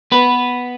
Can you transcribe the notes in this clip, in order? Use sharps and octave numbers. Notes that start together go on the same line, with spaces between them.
B3 B4